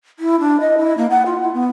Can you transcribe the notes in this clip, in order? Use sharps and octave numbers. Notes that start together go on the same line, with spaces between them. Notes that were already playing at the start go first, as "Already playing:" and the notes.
E4
D4
D#5
E4
A#3
F#5
F4
E4
B3